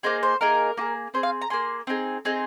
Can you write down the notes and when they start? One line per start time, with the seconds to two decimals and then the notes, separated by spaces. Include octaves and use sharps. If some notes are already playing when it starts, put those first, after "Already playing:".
0.03 A#3 D#4 G#4 C5
0.23 C5
0.41 A#3 D#4 G#4 A#4
0.77 A#3 F4 G#4
1.14 C4 G#4 C5
1.23 F5
1.41 A#5
1.50 A#3 G#4 C6
1.87 C4 D#4 G#4
2.25 C4 D#4 G#4